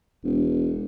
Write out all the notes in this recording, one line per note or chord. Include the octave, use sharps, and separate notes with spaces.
E1